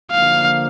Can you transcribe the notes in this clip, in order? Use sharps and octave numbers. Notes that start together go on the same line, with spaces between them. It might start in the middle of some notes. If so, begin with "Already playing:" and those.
D3 F3 A#3 D4 F5